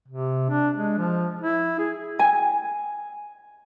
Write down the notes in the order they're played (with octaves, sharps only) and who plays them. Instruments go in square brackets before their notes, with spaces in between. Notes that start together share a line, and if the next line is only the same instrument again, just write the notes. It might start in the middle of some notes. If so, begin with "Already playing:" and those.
[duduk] C3
D4
G#3
F3
E4
G#4
[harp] G#5